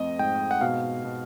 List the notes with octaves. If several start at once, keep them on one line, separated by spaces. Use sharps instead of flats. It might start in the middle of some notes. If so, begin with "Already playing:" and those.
Already playing: F2 A3 C4 D#5
G#2 G5
F#5
B2 F5
B2